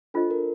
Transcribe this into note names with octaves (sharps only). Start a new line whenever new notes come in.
D4 F4 A4 C5 D#5
A#4